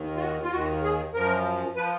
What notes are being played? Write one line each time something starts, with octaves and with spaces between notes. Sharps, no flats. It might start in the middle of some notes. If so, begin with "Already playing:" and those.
Already playing: D#2 D#3
F4
F#4
F4
D#2 D#3 F#4
G#4
F#2 F3 A#4
F3 B4